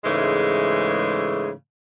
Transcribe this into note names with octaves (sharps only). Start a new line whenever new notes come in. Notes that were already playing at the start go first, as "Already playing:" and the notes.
G#2 C#3 E3 G#3 A3